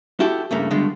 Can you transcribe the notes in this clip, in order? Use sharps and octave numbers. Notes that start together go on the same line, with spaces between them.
E4 F#4 G4 A4
G2 C#3 A3 A#3
G2 B2 D3 G#3 A3